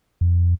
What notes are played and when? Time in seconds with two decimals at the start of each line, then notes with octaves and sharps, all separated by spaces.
0.21 F2